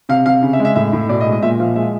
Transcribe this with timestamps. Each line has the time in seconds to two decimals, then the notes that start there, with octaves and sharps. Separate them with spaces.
0.09 C3 F5
0.26 C3 F5
0.42 C#3
0.53 E5
0.60 G#3
0.65 E5
0.76 A2 E5
0.93 A2
1.09 B2 D5
1.21 D#5
1.26 G#3
1.32 D#5
1.43 A#2 E5
1.59 F3 F5
1.76 G#3 E5